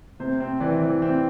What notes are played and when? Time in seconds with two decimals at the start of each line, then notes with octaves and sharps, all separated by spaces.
0.20 C3 C5
0.40 C4
0.60 E3 D5
0.81 E3
1.02 C4